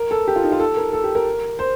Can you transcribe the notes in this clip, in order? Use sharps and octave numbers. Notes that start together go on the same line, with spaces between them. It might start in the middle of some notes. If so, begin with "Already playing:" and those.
Already playing: A#4
A4
G4
F4
D#4
F4
A4
A#4
A4
G4
A#4
C5